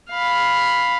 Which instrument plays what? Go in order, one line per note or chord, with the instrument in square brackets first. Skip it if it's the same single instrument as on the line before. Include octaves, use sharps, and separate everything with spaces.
[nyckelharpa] F5 B5